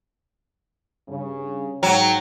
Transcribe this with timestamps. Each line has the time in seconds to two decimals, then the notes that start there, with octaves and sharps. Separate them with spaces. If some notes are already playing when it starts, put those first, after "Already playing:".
1.09 G2 C#3
1.83 G#2 F#3 G5